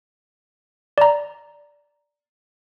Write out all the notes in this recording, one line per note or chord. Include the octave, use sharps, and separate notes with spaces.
D5 A#5